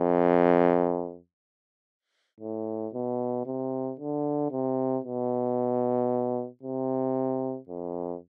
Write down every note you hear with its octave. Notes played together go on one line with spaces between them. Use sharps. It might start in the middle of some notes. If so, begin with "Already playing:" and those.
Already playing: F2
A2
B2
C3
D3
C3
B2
C3
F2